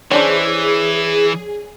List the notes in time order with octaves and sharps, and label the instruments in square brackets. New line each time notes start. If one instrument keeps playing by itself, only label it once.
[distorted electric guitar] E3 [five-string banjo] C#4 D4 C5 [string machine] G#4